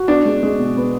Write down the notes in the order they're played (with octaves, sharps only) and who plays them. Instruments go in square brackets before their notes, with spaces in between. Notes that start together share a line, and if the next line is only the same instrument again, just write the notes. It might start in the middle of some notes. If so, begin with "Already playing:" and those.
Already playing: [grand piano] F#4
[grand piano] B3 [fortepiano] D4
[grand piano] G#3
G#3
B2
B3